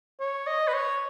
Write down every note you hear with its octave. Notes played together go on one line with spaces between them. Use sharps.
C#5
D#5
B4
C#5